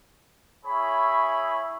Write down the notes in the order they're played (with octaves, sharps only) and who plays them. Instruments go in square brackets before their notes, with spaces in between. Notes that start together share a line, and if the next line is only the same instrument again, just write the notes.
[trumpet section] E4 G#4 C#5 B5 C#6